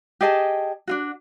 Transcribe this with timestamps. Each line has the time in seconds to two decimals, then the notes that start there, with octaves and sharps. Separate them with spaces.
0.21 G4 G#4 D#5 A5
0.87 D4 F4 F#4